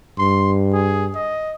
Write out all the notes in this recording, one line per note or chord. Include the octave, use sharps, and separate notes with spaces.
G2 C6
G#4
D#5